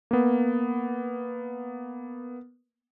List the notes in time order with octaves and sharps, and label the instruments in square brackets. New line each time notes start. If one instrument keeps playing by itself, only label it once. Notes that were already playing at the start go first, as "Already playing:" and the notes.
[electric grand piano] A#3 B3